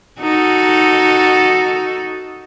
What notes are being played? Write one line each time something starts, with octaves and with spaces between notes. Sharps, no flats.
D#4 F#4 A4